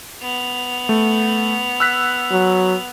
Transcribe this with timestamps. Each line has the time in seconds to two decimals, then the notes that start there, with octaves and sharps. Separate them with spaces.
0.22 B3 F7
0.89 A3
1.80 E6 F#6 B6
2.31 F#3